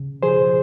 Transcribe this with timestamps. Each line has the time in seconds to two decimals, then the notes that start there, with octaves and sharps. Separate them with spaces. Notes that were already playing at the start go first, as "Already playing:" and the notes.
Already playing: C#3
0.23 F3 G#4 C5